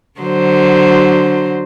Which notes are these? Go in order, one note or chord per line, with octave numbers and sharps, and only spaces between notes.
D3 F#3 C5